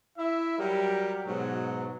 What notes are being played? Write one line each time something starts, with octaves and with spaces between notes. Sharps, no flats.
E4 E5
F#3 G3 G4 A#4
G#2 B2 F#3